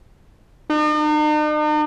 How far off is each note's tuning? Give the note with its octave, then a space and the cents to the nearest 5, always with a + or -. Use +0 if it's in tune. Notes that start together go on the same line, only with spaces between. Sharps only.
D#4 -45